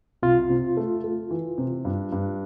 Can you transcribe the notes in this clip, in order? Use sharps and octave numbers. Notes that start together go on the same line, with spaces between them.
C2 F4
C3
A3
A3
E3
C3
G2
G2